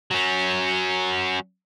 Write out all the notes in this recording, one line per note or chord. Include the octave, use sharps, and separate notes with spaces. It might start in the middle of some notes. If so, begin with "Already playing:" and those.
F#3 C#4